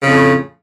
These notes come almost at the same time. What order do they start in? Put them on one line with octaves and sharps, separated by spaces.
C#3 F2 A2